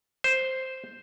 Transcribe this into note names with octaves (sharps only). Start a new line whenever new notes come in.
C5